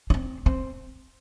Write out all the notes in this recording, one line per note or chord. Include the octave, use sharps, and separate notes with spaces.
D4
C4
C4